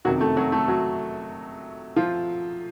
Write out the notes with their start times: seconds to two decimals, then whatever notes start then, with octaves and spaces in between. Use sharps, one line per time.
0.05 F#1 F2 C3 D#3 F#3 F#4
0.21 A3 A4
0.37 F#3 F#4
0.52 A3 A4
0.68 F#3 F#4
1.96 F3 F4